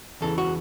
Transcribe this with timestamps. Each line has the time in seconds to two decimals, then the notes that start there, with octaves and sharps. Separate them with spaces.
0.21 E2 C#3 E3 A4
0.38 F#4